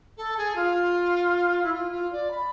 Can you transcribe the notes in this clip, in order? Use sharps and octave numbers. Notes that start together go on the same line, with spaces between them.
A4
G#4
F4
E4
F4
F4
D5
B5